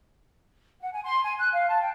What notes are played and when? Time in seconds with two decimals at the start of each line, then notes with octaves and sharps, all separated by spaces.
0.80 F#5
0.92 G#5
1.04 C6
1.22 G#5
1.38 F#6
1.53 F5
1.68 A5
1.81 G5